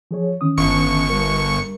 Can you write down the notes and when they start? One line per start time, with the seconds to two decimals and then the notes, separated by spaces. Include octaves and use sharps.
0.11 F3 G#4 C#5
0.41 D#3 C#4 D#6
0.58 G1 C#6 C#7
1.10 G3 A#4